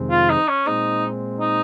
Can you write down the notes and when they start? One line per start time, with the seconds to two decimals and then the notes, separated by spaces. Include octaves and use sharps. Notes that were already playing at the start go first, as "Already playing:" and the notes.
Already playing: F2 C3 D#3 G#3 C4
0.11 F4
0.30 D#4
0.48 C#4
0.67 A#2 G#3 C4 D#4
1.40 D#4